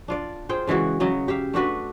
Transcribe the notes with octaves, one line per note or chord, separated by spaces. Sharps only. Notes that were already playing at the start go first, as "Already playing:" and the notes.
D4 F4 D5
F4 G#4 C5 G5
C#3 E3 G#3 F#4
C#3 F#3 D#5 E5
G4 E5 F5
A3 D4 F#4 B4